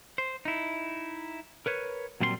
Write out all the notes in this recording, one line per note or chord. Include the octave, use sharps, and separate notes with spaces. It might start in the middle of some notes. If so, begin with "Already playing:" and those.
C5
D#4 E4
A#4 B4 C#5
A#2 F#3 G3 C4 C5 C6